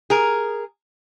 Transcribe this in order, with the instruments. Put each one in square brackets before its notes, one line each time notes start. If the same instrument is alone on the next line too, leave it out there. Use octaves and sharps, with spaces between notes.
[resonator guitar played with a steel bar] G#4 A#4